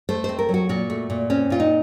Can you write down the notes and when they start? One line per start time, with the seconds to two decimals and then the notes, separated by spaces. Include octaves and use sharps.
0.09 A3 C5
0.24 C4 C5
0.39 A#4
0.49 F#3
0.54 F#4
0.69 A#2 F#4
0.90 A3
1.10 A#2
1.30 C4 C#4
1.50 A#2 F4
1.60 D#4